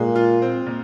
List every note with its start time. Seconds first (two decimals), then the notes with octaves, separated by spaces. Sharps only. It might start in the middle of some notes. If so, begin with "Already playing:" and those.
Already playing: A#2 G#3
0.15 F4
0.42 C4
0.66 A#2